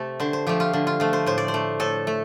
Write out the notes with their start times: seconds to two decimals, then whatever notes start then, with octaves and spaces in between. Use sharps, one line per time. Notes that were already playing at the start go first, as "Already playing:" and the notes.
Already playing: C3 A3 C4 G4 A4
0.20 D3 C5
0.33 C5
0.47 F3 A3 G4
0.60 F4
0.73 D3
0.87 F4
1.00 F3 A3
1.13 C5
1.26 A2 C5
1.38 D5
1.48 C5
1.54 A3
1.80 A2 A4
2.07 A3